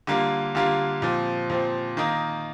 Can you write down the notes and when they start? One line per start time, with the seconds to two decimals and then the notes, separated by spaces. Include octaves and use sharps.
0.07 D3 G3 A#3 F4
0.55 D3 G3 A#3 F4
1.02 A#2 F3 C4
1.50 A#2 F3 C4
1.97 D#3 A#3 D#4